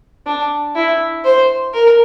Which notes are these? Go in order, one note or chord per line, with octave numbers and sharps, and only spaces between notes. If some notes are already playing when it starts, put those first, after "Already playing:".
D4
E4
C5
A#4